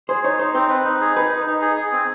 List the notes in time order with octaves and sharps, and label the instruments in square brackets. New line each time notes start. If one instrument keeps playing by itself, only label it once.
[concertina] G#4 [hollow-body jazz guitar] C5
[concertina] D#4 [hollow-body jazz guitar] C#5
[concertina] D#4 [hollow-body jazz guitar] C5
[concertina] C4 [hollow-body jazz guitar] C5
[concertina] B4
D#4
G#4
[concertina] D#4 [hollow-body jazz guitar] B4
[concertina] D#4
D#4
G#4
G#4
C4